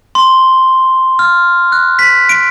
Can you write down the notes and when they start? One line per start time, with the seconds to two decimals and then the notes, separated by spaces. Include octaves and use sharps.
0.15 C6
1.19 F6
1.72 F#6
1.99 B6
2.29 D7